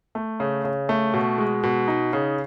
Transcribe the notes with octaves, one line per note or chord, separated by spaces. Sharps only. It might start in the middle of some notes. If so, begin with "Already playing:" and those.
A3
C#3
C#3
A3
B2
G#3
B2
D#4
C#3